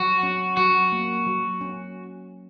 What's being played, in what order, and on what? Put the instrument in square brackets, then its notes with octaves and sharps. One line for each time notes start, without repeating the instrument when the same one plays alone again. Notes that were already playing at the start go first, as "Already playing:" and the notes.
Already playing: [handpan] F#3 [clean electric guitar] F#4
[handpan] C#4
[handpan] F#3 [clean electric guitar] F#4
[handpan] A#3
F#3
C#4